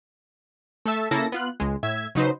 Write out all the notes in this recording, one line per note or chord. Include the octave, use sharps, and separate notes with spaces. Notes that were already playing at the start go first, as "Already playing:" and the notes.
A3 A4 E5 A5
C#3 A#3 E4 A4 A5 A#6
B3 F4 F#6
C#2 G#3
A2 E5 G#6
C#3 F#3 D#4 B4 C5